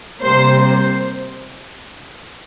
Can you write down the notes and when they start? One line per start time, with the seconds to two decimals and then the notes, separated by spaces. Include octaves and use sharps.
0.22 C3 G3 A#3 C5
0.61 C5